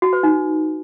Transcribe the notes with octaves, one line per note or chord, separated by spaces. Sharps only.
F#4
B4
D#4